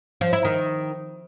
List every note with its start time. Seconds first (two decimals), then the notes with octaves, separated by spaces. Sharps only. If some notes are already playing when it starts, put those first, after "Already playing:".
0.21 F3
0.33 E4
0.45 D#3